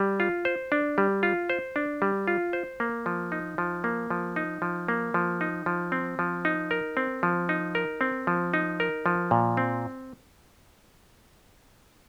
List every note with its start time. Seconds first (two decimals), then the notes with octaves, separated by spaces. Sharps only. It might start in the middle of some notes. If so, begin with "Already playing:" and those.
Already playing: G3
0.20 F4
0.45 C5
0.72 D4
0.98 G3
1.23 F4
1.50 C5
1.76 D4
2.02 G3
2.28 F4
2.53 C5
2.80 A#3
3.06 F3
3.32 D#4
3.58 F3
3.84 A#3
4.10 F3
4.36 D#4
4.62 F3
4.88 A#3
5.14 F3
5.41 D#4
5.66 F3
5.92 C4
6.19 F3
6.45 D#4
6.71 A#4
6.97 C4
7.23 F3
7.49 D#4
7.75 A#4
8.01 C4
8.27 F3
8.54 D#4
8.80 A#4
9.06 F3
9.31 A#2
9.57 C4